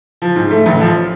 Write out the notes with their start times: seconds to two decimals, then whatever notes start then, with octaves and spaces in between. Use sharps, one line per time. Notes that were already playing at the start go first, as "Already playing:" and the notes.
0.22 F3
0.36 G#2
0.51 A3
0.66 A1
0.81 F3